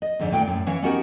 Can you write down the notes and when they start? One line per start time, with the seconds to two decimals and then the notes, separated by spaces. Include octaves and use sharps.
0.02 D#5
0.19 F2 G#2 D3
0.31 G2 A#2 D#3 A3 A#3 G5
0.47 F#2 A2
0.66 E3 C#4 C#5 F5
0.82 B3 C#4 D#4 F#4 G4 A#4